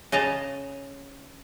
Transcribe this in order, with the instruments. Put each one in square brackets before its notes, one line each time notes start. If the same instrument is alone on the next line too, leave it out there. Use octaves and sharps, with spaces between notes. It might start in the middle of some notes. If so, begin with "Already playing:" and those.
[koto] C#3 D#5 A5 A#5